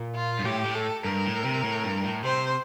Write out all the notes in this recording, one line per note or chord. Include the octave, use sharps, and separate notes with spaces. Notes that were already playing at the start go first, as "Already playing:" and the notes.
Already playing: A#2
F4
G2
A2 G4
A2
A4
G2 A#4
A2
C3
A2
G2
A2
C3 C5